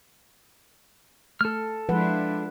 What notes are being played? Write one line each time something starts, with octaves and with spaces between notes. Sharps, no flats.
A3 A4 F6
F3 G#3 D4 E4 F4 B4 F#5